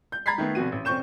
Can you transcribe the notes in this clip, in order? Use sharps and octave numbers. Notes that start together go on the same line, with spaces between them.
G6
A#5 B5 G#6 A6 B6 C7
D#3 A3 B3
F1 F2 B2 F#4 D#7
A1
F1 C4 C#4 C#6 G6 E7